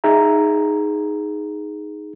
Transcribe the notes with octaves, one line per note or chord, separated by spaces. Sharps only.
D#4 G#4 E5 A#5